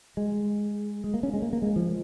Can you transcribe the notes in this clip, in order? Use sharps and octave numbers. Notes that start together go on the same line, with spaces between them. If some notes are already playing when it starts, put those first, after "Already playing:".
G#3
G#3
A#3
C#4
G#3
A#3
A#3
G#3
F3